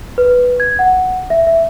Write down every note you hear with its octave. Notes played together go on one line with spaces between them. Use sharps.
B4
G#6
F#5
E5
E5